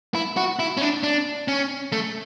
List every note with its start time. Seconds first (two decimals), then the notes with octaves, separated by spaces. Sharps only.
0.14 E4
0.37 F#4
0.59 E4
0.77 C#4
0.82 D4
1.03 D4
1.48 C#4
1.92 A3